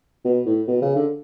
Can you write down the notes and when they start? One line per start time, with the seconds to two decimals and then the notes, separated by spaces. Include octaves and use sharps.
0.24 B2
0.46 A2
0.67 B2
0.82 C#3
0.95 D3